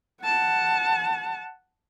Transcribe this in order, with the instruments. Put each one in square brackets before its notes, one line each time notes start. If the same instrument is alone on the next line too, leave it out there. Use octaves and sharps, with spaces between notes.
[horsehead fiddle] F#5 A5